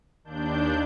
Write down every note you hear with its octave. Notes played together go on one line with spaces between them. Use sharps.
D#2 D4 G6